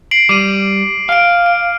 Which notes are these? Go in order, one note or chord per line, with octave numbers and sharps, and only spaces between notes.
C7 D7 F#7
G3 D6 D#7
F5 F6 D7
D7